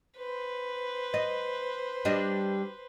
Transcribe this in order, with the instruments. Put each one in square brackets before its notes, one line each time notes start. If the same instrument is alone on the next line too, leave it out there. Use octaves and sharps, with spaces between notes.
[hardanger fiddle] B4 C5
[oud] D#5
G3 D4 D#5